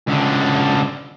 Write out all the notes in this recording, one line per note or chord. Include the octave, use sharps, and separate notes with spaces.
C#2 D3